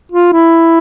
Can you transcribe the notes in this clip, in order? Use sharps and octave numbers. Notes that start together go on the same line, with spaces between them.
F4
E4